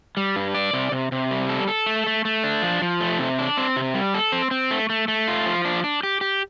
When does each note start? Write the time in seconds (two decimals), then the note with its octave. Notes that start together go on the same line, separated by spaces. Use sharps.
0.17 G3
0.36 G2
0.55 D5
0.73 C3
0.92 C3
1.12 C3
1.31 G3
1.49 A4
1.68 A4
1.86 A3
2.06 A3
2.25 A3
2.44 D4
2.62 F3
2.82 F3
3.00 A3
3.19 C3
3.39 D4
3.57 C4
3.76 C3
3.94 G3
4.14 A4
4.32 C4
4.51 C4
4.71 A3
4.89 A3
5.08 A3
5.28 F4
5.46 F3
5.65 D4
5.84 D4
6.03 G4
6.21 G4